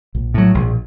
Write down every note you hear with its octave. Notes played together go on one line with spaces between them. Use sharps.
A#1
A2 F#3
A#1